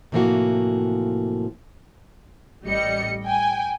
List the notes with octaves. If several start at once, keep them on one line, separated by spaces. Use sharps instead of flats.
A2 C3 E3 F3 A#3 F#4
A1 G3 D#5 C#7
G5 G#5